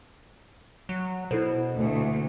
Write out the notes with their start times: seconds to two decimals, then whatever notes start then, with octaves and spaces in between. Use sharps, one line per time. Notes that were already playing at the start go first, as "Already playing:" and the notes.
0.89 F#3
1.31 B2 E4 A4 C5
1.75 D2 A#2 A3